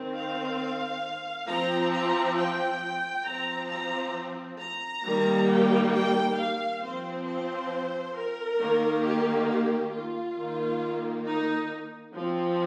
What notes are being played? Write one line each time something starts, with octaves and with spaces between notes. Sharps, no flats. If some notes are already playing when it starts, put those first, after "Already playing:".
Already playing: D#3 C4
F5
F3 C4 A#5
A#5
G5
F3 C4 A#5
A#5
A#5
D#3 G3 A#3
G5
G5
F5
F3 C4 C5
C5
A#4
D#3 A#3
G4
G4
F4
D#3 A#3
D#4
F3 C4